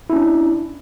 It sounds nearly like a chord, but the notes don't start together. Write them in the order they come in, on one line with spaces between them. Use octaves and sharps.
E4 C#4 D4